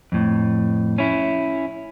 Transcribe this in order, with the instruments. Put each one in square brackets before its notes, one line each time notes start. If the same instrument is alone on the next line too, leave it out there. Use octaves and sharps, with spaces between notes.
[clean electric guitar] F2 A2
C#4 E4